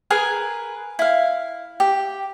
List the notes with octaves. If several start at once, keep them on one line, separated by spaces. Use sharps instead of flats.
G#4 A#4 B4 G#5
E4 F5
G4